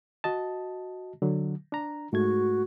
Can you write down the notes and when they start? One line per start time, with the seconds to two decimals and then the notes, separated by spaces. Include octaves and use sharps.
0.24 F#4 D#5 A5
1.22 D3 F#3
1.72 D4 A#5
2.13 G#2 A3 F#4 G#6